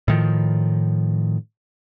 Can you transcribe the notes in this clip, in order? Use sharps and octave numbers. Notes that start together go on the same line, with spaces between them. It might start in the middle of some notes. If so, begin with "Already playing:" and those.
A2 D#3 F3